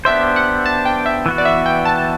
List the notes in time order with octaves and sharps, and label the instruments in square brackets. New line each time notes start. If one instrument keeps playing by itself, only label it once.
[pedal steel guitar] B3 D4 G4 C5 [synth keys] E5
[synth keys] F#5
A5
G5
E5
[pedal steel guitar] E3 B3 F#4
[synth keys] D5
E5
G5
A5